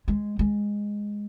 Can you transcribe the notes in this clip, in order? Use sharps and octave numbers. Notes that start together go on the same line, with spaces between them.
G#3
G#3